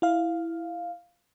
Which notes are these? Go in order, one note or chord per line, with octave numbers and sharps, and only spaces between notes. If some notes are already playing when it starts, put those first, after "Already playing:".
E4 F5